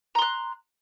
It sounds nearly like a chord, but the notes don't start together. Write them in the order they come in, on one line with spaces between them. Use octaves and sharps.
A#5 C6 F#6